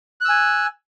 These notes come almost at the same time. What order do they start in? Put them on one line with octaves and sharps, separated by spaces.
F#6 E6 G#5